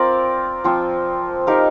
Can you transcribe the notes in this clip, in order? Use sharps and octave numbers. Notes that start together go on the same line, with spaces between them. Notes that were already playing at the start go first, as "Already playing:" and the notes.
Already playing: C4 F4 A#4 D5
F3 C4 F4
D#4 G4 A#4 F5